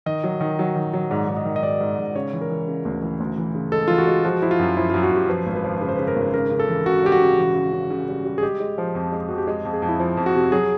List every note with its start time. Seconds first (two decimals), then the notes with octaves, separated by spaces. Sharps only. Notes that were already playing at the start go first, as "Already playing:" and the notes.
0.06 D#3 D#5
0.24 F#3
0.41 D#3
0.59 F#3
0.75 D#3
0.93 F#3
1.11 G#2 D5
1.28 G#2
1.37 D#5
1.45 D#3
1.56 D#5
1.63 G#2 D5
1.80 G#2
1.98 G#2
2.15 C#3 C#5
2.33 E3
2.41 A#4
2.50 E3
2.68 C#3
2.85 D2
3.02 E3
3.20 D2
3.38 E3
3.55 C#3
3.72 G#3 A4
3.88 E3 F4
3.98 F#4
4.07 G#3
4.24 F3 F#4
4.42 F3 E4
4.51 F4
4.59 F#2
4.77 F3 E4
4.90 F#2 F4
5.03 F#4
5.12 F#2 G4
5.29 F3 B4
5.47 G#1
5.56 B4
5.64 F3
5.81 C#3 B4
5.89 C5
5.95 C#3 B4
6.08 A#4
6.16 G#1
6.34 C#3 A#4
6.51 C#3
6.59 A4
6.69 E3
6.86 C#3 F#4
7.03 G3 G4
7.12 F#4
7.21 C#3
7.38 E3
7.55 C#3
7.72 C#3
7.90 C#3
8.08 G3
8.25 G3
8.38 G#4
8.43 G#3 G4
8.60 G#3
8.78 F3
8.95 F2
9.12 G#3
9.29 F2 F#4
9.38 G4
9.47 G#3 G#4
9.65 F2
9.74 G#4
9.82 F2
9.89 E4
10.00 F3 F4
10.17 F2
10.26 F#4
10.35 C3
10.52 F#3 G#4